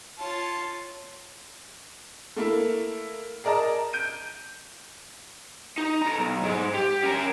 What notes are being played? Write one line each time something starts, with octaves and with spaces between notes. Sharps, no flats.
F4 C#5 A5
A3 A#3 E4
G#4 A#4 D5 D#5 A5 A#5
G6 D7 D#7
D#4
A4 A#5
B1
G#2 G#3
G4
C#4 A#4